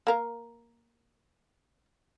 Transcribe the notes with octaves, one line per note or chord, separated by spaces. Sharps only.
A#3 A#4 F5